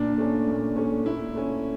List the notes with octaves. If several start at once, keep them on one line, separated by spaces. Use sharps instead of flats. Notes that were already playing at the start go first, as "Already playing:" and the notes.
Already playing: A#2 D4
A3 C#4
A#2
A3 C#4
A#2 E4
A3 C#4